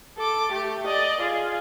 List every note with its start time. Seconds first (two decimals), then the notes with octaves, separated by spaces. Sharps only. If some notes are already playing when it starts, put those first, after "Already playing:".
0.17 A4 D6
0.52 A3 G4
0.86 D5 D#5
1.21 F4 G#4